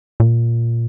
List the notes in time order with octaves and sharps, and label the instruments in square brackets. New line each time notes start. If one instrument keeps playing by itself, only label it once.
[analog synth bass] A#2